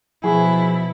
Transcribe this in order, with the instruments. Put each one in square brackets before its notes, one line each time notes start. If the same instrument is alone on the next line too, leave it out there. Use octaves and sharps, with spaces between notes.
[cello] B2 E4 [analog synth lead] F3 [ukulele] F#4 G#4